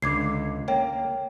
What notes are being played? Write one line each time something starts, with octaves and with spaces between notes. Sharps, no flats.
C#2 D3 D6 G#6 C7
A#3 C#5 G5